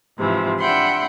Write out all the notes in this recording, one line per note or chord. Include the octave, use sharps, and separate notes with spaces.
G#2 C3 E3 F3
D4 E5 F#5 G5 B5 C6